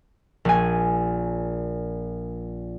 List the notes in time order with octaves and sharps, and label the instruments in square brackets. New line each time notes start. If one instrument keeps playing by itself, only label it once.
[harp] A#1 G#5